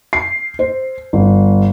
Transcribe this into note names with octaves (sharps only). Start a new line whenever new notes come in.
C7
C5
G1